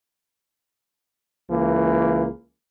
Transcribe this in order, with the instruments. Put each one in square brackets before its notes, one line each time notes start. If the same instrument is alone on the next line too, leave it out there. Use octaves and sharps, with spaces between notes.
[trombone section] C#2 E3 A#3